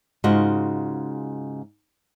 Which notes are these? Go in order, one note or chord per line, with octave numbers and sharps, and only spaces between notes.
G#2 C#3 F4 F#4 D#5